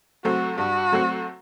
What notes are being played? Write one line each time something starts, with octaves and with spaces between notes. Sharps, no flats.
F#3 A3 C4 F#4
G2 F#4
F#3 A3 C4